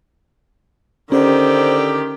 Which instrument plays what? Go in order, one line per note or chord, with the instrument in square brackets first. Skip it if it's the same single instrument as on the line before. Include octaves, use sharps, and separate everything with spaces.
[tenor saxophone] D3 [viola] D#3 G4 [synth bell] C#4 [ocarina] C5